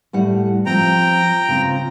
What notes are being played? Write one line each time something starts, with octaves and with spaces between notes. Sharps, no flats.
A2 G3 F#5
F3 C4 G5 A#5
C#3 C4 F4